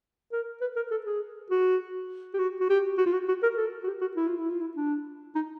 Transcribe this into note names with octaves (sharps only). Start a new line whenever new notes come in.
A#4
B4
A#4
A4
G#4
F#4
G4
F#4
F#4
G4
F#4
F4
F#4
F#4
A#4
A4
F#4
G4
F#4
E4
F4
E4
F4
E4
D4
D#4